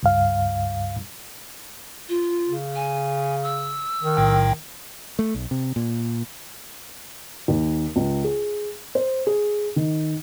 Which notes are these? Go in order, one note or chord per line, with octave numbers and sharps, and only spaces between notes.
C#2 G2 F5
F4
C#3
G#5
E6
D#3
B1 A2 G5
A3
B1
C3
A#2
D#2
C#2
G#4
C5
G#4
D#3